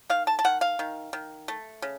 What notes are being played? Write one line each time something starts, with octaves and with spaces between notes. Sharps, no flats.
D#3 F5
A5
A5
D#3 F#5
F5
D#3
D#3
A3
C#3